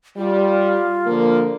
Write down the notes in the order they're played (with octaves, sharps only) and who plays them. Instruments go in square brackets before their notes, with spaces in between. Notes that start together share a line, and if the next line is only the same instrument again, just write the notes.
[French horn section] G3 [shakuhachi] F4
[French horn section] D3 F3 A#3